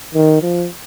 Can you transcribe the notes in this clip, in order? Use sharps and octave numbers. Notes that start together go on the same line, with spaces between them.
D#3
F3